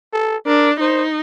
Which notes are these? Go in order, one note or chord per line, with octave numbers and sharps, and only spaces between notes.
A4
D4 A#4
D#4 C5